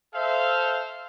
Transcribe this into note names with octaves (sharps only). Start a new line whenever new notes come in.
A4 C5 E5 F5